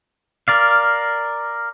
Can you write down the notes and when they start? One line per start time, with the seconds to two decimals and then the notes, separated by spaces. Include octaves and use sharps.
0.48 A#4 D5 F5